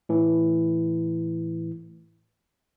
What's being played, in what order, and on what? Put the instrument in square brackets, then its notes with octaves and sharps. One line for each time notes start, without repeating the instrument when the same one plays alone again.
[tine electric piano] A2 E3